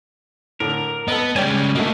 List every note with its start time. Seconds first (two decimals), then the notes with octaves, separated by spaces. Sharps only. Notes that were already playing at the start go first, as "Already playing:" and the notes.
0.60 A2 D3 A#4
1.08 B3 A4 B4 D#5
1.36 C#3 G3 G#3 C#5 D5 G5 G#5
1.75 A3 A#3 F#4 A4 D#5